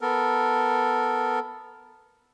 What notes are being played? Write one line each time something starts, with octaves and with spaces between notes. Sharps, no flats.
B3 A4 A#4